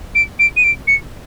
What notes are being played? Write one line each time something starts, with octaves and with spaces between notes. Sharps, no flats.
D7
D7
D#7
D7
C#7